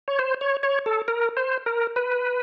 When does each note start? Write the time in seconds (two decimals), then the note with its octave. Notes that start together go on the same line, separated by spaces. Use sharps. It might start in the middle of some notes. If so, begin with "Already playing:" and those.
0.08 C#5
0.19 C5
0.41 C#5
0.63 C#5
0.86 A4
1.08 A#4
1.37 C5
1.66 A#4
1.96 B4